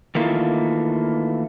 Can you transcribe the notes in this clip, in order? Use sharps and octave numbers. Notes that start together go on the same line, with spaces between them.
D#3 E3 A3 A#3 F4